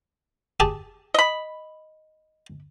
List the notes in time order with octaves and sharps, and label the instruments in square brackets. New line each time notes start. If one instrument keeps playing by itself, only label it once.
[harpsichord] G4 G#4 A5
[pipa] D#5 B5